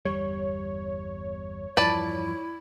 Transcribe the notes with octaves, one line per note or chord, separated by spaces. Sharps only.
G1 E2 G3 C#5
E2 G2 F3 E4 B4 D5 A5